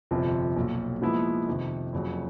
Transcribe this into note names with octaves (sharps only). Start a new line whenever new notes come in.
G1 F2 C3 F3
B1 A#2 F#3
A#2 F3 G#3 B3 E4
F2 C3 D#3
F#1 F2 C#3 F#3